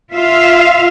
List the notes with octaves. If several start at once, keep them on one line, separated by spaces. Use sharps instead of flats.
F4 E5 F5